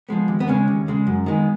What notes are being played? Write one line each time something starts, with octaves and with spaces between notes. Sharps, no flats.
F3 G#3 B3
D#2
B3
C#3 G#3 C#4
D#2
C#3 G#3
F#2
D#3 G#3 B3